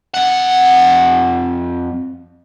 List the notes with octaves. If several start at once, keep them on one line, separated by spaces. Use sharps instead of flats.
F2 F#5